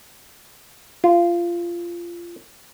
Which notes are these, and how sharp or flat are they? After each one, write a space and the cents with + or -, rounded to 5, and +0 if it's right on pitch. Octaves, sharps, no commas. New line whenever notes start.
F4 -20